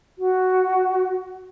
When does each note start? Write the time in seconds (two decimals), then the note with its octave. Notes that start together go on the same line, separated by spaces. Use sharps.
0.19 F#4